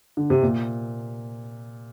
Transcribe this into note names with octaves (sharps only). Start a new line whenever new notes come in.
D3
C3
A#2